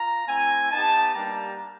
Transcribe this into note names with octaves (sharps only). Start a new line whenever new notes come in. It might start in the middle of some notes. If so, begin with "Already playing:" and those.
Already playing: F4 A#5
A3 C4 E4 G#5
B3 D#4 G4 A5
G3 A#3 D4 G4 A#5